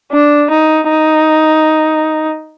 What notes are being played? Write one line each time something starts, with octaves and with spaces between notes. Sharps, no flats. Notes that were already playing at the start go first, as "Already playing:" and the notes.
D4
D#4
D#4